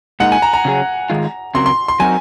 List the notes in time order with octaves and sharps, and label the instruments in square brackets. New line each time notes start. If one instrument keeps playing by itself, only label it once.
[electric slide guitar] A#2 G#3 D#4 A#4 [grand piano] F#5
[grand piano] G#5
A#5
A#5
[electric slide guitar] C#3 F#3 C#4 G#4
G#2 D#3 G#3 F4
[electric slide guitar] C#3 F#3 C4 F#4 A#4 [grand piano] C6
[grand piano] C6
C6
[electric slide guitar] F#3 C4 D#4 F#4 A#4 [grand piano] G#5